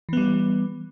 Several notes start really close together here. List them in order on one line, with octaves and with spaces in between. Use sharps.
E3 B3 G3